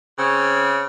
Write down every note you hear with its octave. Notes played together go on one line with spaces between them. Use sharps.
C#3 C4 C#5